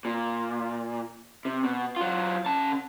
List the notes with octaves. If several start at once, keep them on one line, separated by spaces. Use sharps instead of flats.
A#2
C3
B2
F#3 F4
C#3 A5